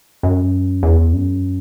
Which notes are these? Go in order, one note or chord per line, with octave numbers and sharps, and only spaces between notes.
F#2
E2
F#2